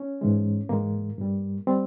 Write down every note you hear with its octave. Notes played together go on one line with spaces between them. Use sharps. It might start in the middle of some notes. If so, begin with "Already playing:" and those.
Already playing: C#4
G#2 E3 G#3
G#2 E3 G#3 A#3
G2 G3
G3 C4